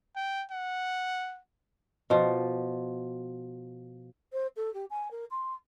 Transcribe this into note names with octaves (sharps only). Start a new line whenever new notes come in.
G5
F#5
B2 F3
C5
A4
G4
G#5
A#4
C6